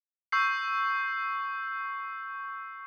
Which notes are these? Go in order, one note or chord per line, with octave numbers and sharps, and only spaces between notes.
C#6 E6 G6 C7